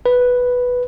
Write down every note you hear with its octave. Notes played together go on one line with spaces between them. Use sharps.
B4